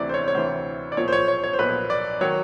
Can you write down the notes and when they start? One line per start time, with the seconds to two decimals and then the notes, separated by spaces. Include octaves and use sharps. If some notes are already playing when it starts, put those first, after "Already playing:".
Already playing: D2 C3 E3 D5
0.09 C5
0.14 C#5
0.28 C#5
0.35 D2 C3 E3 C5
0.92 D5
0.97 B1 A#2 F3 C#5
1.08 C5
1.13 C#5
1.28 C#5
1.44 C#5
1.53 C5
1.59 B1 A#2 F3 B4
1.90 D5
2.21 D#3 F#3 C#5